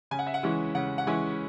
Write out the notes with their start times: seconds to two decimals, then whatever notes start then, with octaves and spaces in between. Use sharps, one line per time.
0.11 C#3 G#5
0.19 F#5
0.27 E5
0.34 F#5
0.43 E3 G#3 C#4 E4
0.75 C#3 F#5
0.98 F#5
1.07 E3 G#3 C#4 E4 G#5